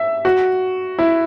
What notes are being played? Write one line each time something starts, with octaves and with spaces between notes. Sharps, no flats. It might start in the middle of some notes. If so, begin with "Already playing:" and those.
Already playing: E5
F#4
E4